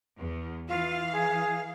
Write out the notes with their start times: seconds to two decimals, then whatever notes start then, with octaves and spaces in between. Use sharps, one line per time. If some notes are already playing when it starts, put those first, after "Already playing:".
0.17 E2
0.68 E3 F4 F5
1.12 G#4